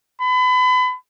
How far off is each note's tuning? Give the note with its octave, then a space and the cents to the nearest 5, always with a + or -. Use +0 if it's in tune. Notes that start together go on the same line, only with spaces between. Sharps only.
B5 +35